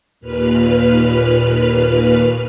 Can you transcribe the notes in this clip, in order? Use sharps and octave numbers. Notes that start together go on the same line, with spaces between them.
D#2 A#2 B4 F6